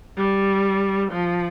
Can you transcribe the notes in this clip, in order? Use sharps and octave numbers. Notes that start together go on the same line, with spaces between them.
G3
F3